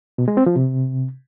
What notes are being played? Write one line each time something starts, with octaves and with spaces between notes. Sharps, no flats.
B2
G#3
C4
F3
C3